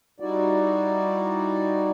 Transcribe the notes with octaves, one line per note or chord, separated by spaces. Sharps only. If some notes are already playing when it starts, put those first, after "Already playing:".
G3 D#4 E4 F#4 D5